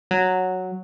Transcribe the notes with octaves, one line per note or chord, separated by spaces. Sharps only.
F#3